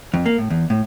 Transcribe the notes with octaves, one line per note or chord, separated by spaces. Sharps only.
F2
A#3
A2
E2
A2